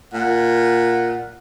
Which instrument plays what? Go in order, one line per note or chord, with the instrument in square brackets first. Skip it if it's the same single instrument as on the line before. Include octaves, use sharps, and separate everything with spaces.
[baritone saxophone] A#2 [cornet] F#5